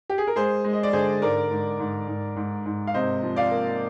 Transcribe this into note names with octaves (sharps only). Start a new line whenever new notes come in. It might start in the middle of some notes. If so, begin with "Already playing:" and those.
G4
G#4
A#4
G#3 G#4 C5
G#3
D#5
D5
D3 G#4 C5
G#2 A#4 D5
G#2
G#2
G#2
G#2
G#2
F5
C3 C5 D#5
F3
D5 F5
A#3